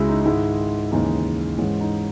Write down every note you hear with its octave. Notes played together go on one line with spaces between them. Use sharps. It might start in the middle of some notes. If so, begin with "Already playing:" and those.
Already playing: C#2 C#3 G#3 E4 F#4 G#4
D#4
G#2 D#3 G#3 E4
D#2 C#3 E3 G#3 D#4
G#2 E3 G#3 C#4
D#4